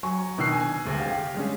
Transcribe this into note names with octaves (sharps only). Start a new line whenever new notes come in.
F#3 G#5 C#6
B2 D#3 D4 E6 F#6 C7
G#5
F1 D2 G#3
G4 F5
G3 G#3 C#4